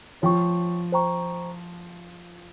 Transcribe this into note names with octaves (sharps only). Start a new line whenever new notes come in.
F3 C#5 G5 C#6
C5 G5 A#5 C#6